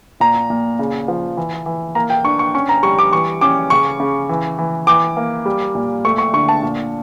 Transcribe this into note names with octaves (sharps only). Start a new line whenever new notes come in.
A#2 A#5
A#2
C#3
F3
E3
E3
A#3 A#5
G5
D4 C#6
C#6
C#4 C#6
A#5
G3 C#6
D6
E3 C#6
C#4 D6
C#3 C#6
C#3
E3
E3
E3 D6
A#3
G3
A#2
A3 C#6
C#6
D3 C#6
A5
A#2